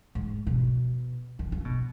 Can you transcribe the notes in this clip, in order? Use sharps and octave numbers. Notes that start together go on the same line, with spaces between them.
G#2
B2
D#3
C#3
B2